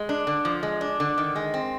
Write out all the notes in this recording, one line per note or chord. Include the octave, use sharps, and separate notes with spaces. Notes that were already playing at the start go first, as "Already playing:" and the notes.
Already playing: G#3
D4
D3
F3
G#3
D4
D3
D#3
G#3
C4